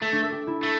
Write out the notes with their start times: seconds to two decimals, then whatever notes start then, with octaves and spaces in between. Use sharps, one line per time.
0.01 A3 A4
0.12 D4
0.22 A4
0.32 G4
0.47 E4
0.63 A3